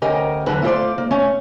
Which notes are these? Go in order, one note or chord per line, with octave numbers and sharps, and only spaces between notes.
D2 C#4 G4 A#4 D#5
E2 G#2 D3 F#3 B4
A3 E4 F4 G4 C5 D5
A#3
A3 C#4 C#5